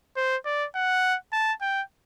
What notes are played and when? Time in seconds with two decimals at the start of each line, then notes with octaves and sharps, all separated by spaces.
0.16 C5
0.45 D5
0.75 F#5
1.33 A5
1.61 G5